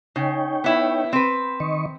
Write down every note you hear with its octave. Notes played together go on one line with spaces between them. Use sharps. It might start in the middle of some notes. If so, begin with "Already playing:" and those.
C#3 D#4 C#5 G5
B3 E4
C4 B4
D#3 D#5 C#6